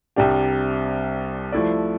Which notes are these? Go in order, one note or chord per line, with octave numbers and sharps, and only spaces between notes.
C2 C3 G3 D4 G4
F3 A3 E4 A4 D5